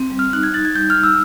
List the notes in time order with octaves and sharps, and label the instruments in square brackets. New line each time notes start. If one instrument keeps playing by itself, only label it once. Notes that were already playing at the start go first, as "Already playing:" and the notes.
Already playing: [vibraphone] C4
G3
[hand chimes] F6
[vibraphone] D#4 [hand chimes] F#6
[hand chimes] G#6
[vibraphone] D#4 [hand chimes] A6
[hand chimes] G#6
[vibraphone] G3 [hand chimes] G6
[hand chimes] F6
[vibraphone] D#4
[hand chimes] E6